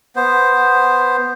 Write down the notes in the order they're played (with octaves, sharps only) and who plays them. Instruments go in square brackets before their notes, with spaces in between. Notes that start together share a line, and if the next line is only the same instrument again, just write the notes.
[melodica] B3 C5